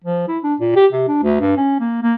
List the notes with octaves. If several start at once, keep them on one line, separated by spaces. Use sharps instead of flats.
F3
E4
D4
A#2
G4
C3
D4
D2
G2
C#4
A#3
A#3